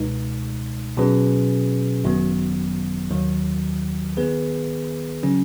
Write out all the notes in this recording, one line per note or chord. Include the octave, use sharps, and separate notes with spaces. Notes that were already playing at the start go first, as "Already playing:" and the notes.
Already playing: C#2 B2 G#3 D#4
B2 F#3 C#4 G#4 B4
G#1 F#2 D#3 F#3 B3
D#2 D#3 F#3
D#3 B3 G#4 B4
C#3 F#3 C#4